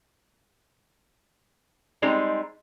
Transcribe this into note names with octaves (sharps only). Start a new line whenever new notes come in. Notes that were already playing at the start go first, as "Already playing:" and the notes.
G3 G#3 C4 D#4 G#4 D5